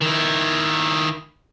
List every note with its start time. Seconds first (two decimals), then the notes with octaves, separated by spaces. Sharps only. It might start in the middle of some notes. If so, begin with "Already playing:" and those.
0.02 D#3 E4